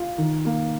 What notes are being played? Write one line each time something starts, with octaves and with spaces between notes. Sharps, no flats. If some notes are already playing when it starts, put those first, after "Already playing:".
Already playing: F4
D#3
A#3